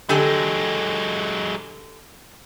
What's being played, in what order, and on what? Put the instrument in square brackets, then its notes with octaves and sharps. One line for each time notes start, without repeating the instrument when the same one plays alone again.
[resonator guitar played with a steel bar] D3 G4 G#5 [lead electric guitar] F#3 G#3